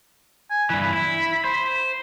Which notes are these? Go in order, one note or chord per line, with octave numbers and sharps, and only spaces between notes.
G#5
G2 E3 B5
E4
C5